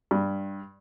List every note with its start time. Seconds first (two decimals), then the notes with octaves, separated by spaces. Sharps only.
0.11 G2